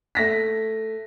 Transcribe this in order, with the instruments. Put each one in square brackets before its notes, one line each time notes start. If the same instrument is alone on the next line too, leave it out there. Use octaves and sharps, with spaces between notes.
[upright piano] A3 A#6 B6